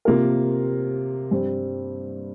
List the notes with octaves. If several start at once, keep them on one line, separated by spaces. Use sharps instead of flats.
C3 A#3 F4 A#4
G2 G3 C4